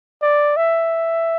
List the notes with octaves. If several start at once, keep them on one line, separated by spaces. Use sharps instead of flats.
D5
E5